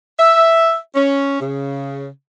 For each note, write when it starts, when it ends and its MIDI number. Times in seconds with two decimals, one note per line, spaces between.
0.19 0.78 76
0.95 1.36 61
1.40 2.07 49